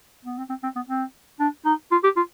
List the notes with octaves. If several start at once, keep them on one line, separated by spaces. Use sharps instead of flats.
B3
C4
C4
C4
B3
C4
D4
D#4
F4
G4
F4